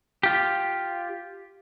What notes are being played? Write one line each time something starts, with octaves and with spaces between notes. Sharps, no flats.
F4 G4